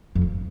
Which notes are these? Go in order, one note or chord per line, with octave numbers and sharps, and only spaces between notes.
F2